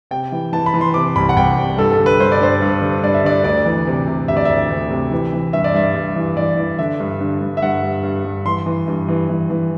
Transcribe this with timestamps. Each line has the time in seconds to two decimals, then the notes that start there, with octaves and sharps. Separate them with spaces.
0.11 C3 G5
0.32 E3
0.53 E3 A5
0.66 B5
0.74 E3
0.81 C6
0.94 C3 D6
1.16 C2 B5
1.29 F#5
1.36 C2 G5
1.57 C3
1.78 G2 A4
1.92 A4
1.99 D3
2.06 B4
2.20 G2 C5
2.32 D5
2.41 G2 C5
2.62 G2
2.82 D3
3.03 G2 D5
3.14 E5
3.25 D3 D5
3.44 D2 D5
3.66 E3
3.87 C3
4.07 C3
4.28 D2 E5
4.37 D5
4.45 D2 E5
4.70 D2
4.91 C3
5.12 E3
5.33 E3
5.53 G2 E5
5.64 D5
5.74 G2 E5
5.95 G2
6.16 E3
6.37 E3 D5
6.57 E3
6.79 D3 E5
7.00 G2
7.21 D3
7.42 G2
7.57 E5
7.62 G2 F#5
7.83 G2
8.03 G2
8.25 G2
8.45 E3 C6
8.66 E3
8.88 G2
9.09 E3
9.29 E3
9.50 E3